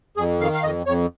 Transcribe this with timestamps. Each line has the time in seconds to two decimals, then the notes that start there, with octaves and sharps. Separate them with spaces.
0.17 F2 G#4
0.40 D#3 F5
0.53 F5
0.63 F2 D#5
0.86 F2 C#5